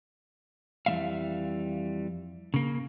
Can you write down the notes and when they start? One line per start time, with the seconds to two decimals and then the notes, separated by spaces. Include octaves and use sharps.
0.86 F2 E3 G3 G#3 E5 F5
2.54 C#3 A#3